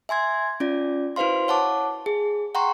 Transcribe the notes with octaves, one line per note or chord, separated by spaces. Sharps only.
E5 G#5 C6 G#6
C#4 F4 D5
E4 F#4 B4 C5 F5 C6
C#5 F#5 A5 D6
G#4
F#5 G5 A#5 C6 C#6